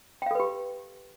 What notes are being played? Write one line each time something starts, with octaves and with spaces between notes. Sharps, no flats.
G4 A4 B4 F5 G5